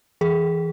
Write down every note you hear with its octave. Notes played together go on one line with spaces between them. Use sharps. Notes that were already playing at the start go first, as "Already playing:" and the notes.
E3 G#4